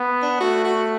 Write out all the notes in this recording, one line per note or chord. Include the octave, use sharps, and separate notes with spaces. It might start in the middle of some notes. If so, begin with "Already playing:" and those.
Already playing: B3
D4
A3 F#4
F#4